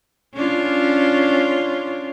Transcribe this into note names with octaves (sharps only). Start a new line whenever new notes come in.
C#4 D4 F4